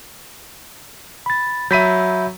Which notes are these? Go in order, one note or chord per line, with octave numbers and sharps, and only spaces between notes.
B5 A6
F#3 E5 B5 G6 B6 D#7